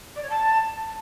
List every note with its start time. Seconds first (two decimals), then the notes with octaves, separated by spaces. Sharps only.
0.15 D5
0.22 C#5
0.29 A5